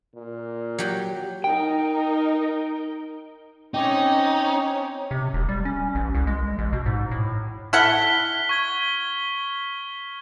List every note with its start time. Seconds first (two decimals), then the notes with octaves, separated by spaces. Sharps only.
0.15 A#2
0.78 F#3 G4
1.44 D#4 A#4 G5
3.74 C4 C#4 D#4 C#5 G5 D6
5.11 C3
5.34 E1
5.49 G3
5.65 C#4
5.95 A1
6.15 C2
6.27 G#3
6.58 A1
6.73 B2
6.86 G#2
7.11 A2
7.73 E4 A4 F#5 F6 B6 G7
8.49 C#6 G#6 G7